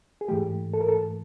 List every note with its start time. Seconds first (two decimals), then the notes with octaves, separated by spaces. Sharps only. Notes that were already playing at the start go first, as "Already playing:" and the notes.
0.21 G#4
0.28 G#2 E3 A3 G4
0.74 A4
0.80 A#4
0.88 A4